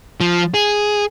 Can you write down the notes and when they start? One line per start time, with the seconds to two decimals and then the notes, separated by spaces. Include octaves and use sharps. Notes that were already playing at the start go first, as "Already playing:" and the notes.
0.21 F3
0.54 G#4